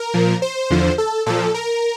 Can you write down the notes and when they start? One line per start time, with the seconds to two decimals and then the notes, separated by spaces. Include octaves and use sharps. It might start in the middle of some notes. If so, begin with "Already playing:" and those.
Already playing: A#4
0.14 A#2 F3
0.42 C5
0.70 E2 D3 F3
0.98 A4
1.26 A#2 F3 A4
1.54 A#4